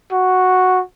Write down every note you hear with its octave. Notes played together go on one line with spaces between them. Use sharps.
F#4